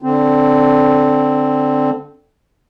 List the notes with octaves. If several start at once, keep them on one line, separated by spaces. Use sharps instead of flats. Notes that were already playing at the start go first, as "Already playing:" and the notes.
D3 C4